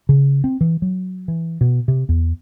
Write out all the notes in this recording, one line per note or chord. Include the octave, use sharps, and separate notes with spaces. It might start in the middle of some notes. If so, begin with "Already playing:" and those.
C#3
C4
E3
F#3
E3
B2
C3
E2